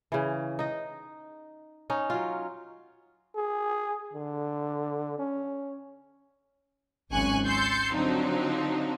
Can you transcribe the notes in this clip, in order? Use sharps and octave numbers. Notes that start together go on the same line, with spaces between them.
C#3 E3
D#4 D#5
C#4 D#4
F#3 F4
G#4
D3
C#4
G#1 C#2 F#3 G#5 C#6 F#6
C6 E6 G6 A6 C7 C#7
D3 F3 F#3 C4 D4 D#4